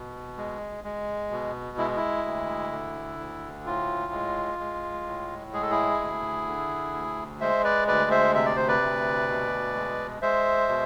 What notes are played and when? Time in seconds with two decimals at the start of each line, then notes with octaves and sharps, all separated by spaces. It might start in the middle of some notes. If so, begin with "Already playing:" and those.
Already playing: B2
0.37 G#3
0.84 G#3
1.31 B2
1.78 G#3 E4
1.97 E4
2.25 D2
2.72 D3
3.19 D2
3.66 A2 F4
4.13 G#3
4.59 G#3
5.06 A2
5.53 G#3 G#4
5.62 A4
5.70 E4 G#4
6.00 D2
6.47 D3
6.94 D2
7.41 G#3 C5 E5
7.64 B4 D5
7.87 D2 B4 D5
8.11 C5 E5
8.34 C3 E5
8.46 D5
8.57 C5
8.68 B4 D5
8.81 D2
9.28 B2
9.75 G#3
10.22 G#3 C5 E5
10.69 B2